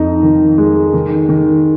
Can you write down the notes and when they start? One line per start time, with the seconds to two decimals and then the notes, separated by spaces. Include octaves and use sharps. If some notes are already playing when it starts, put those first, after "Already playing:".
Already playing: F2 D#4
0.23 D#3
0.58 G#3
0.93 D#3
1.29 D#3